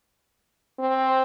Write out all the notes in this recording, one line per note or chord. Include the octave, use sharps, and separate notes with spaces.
C4